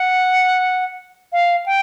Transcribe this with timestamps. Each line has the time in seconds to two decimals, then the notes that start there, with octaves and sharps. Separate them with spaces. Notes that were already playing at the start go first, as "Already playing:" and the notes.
Already playing: F#5
1.32 F5
1.66 G5